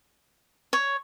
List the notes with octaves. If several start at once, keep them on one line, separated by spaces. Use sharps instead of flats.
C#5